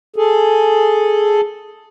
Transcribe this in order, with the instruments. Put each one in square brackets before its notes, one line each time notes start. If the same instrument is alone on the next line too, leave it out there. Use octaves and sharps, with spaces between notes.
[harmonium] G#4 A4